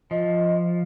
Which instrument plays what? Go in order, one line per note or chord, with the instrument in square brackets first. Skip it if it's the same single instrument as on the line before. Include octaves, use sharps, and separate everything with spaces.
[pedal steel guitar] F3 [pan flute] D#5